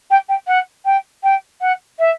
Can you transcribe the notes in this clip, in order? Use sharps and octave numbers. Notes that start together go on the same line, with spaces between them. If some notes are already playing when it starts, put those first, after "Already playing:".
G5
G5
F#5
G5
G5
F#5
E5